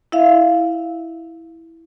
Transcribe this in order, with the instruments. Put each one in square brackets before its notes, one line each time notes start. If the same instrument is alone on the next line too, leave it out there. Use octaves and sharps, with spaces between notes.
[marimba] E4 E5 F5